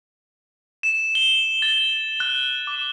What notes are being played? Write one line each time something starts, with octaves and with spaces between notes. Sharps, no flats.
E7
G7
A6
F#6
D6